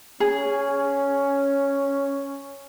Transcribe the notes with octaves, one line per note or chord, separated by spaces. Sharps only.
C#4 G#4